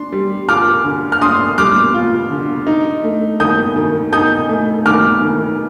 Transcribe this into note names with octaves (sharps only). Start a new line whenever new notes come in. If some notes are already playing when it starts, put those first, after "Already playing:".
Already playing: D4 C6
G3
F4 D6 F6
D3
F6
D4 C6 D#6
G3 D6 F6
F4
D3
D#4
A3
D#3 D#6 G6
D#3
D#4 D#6 G6
A3
D#3 D6 F6
D#3